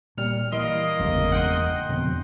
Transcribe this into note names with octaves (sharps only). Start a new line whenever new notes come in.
A#2 G3 F6 C#7
E3 A#3 D#5 C6 D7
G1 E2 C#3 G#3
F#5 G5 C6
F2 B2 D3